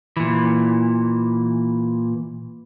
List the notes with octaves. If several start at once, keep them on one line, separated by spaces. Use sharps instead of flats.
A#2 E3